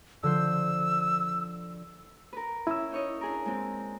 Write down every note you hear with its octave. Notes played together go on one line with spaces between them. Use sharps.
D3 F3 C5 E6
A#4 B4
C#4 E4 E6
D#4 C#5 D#5
D4 G#4 A#4
G#3 C4